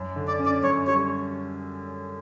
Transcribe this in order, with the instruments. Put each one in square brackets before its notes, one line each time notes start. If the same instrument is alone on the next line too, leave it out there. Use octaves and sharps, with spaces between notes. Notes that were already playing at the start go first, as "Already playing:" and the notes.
Already playing: [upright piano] F#2
D3
[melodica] D5
[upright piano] C#4
[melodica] D5
[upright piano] F#2 [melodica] C#5
[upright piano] G3 [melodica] C#5